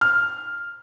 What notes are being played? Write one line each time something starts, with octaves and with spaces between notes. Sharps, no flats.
F6